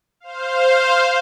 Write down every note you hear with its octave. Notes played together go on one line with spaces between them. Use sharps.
C5 F5